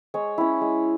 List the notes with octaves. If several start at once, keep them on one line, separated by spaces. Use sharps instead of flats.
G#3 C#5
C#4 E4
G#3